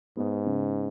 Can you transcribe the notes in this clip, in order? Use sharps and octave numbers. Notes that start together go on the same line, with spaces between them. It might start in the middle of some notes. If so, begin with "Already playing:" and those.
G#2 B3
C#3